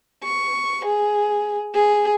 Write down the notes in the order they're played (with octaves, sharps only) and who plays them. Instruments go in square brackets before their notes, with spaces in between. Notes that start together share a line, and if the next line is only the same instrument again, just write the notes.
[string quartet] C#6
G#4
G#4